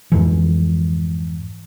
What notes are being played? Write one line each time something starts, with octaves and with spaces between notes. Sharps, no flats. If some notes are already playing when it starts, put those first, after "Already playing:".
F2 G#2 E3